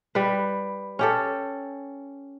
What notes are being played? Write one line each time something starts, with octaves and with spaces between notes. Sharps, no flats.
G3 B4
C#4 G4 A4